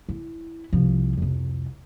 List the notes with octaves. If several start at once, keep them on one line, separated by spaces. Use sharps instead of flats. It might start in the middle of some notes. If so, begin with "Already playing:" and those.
E4
C2 F3
C2 F2